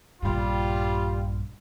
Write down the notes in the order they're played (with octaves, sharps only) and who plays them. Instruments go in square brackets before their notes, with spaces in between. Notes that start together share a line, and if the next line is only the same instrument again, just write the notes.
[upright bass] A#1 G2 [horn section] G3 F4